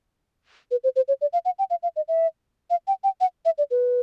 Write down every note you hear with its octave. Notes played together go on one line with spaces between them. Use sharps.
B4
C5
C5
C#5
D5
F5
F#5
G5
F5
F5
D#5
E5
F5
G5
G5
F#5
E5
D5
B4